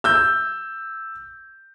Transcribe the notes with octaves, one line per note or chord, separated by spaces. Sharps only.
E6 G6